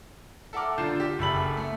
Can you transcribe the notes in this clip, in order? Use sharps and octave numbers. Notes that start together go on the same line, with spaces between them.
A4 E5 F#5 A#5 D6 F6
D3 F4 G6 C7 E7
G4
F#1 A4 E5 B5 B6 F#7
A3